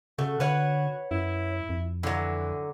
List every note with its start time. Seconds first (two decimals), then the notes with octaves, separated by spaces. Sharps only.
0.19 C#3 A3 F#4
0.40 D3 B4 C#5 F#5
1.11 F#2 E4
1.69 F2
2.03 D3 E3 F#3